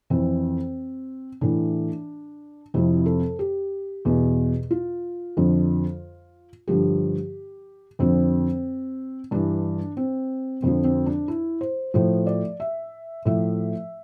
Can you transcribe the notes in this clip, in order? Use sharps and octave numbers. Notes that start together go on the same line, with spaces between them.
F2 E3 C4
A2 E3 D4
F2 C3 F3 E4
A4
G4
E2 B2
F4
F2 D3 F3
G2 D3 F3 G4
F2 D3 F3 C4
G2 E3 D4
C4
F2 D3 F3 C4
C4
D4
E4
C5
A2 F3 C5
D5
E5
A2 F3 E5